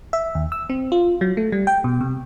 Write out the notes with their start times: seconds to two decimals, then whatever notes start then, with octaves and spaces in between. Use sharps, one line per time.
0.13 E5
0.35 D#2
0.52 E6
0.70 C4
0.92 F4
1.21 F#3
1.37 A3
1.52 G3
1.67 G5
1.84 B2
2.01 C3